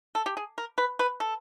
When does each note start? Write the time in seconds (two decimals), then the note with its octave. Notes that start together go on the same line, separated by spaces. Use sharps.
0.15 A4
0.26 G4
0.37 G#4
0.58 A#4
0.78 B4
0.99 B4
1.20 A4